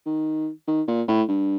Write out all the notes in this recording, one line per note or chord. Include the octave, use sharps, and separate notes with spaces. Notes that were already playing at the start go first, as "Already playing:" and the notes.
D#3
D#3
A#2
A2
G2